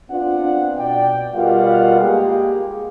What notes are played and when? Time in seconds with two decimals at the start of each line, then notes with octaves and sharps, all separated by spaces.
0.11 B3 C4 D4 F4 D5 F#5
0.77 B2 D5 G5
1.34 B2 G3 F4 A#4 F5 F#5
2.01 G#3 A#3 G4 G#4